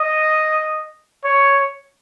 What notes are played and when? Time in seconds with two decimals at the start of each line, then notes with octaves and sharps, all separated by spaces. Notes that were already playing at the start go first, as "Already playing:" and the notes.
Already playing: D#5
1.24 C#5